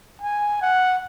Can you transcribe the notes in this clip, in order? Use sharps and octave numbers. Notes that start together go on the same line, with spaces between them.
G#5
F#5